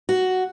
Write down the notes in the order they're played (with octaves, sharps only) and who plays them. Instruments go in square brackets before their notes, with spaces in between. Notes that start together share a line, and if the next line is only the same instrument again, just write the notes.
[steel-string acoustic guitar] F#4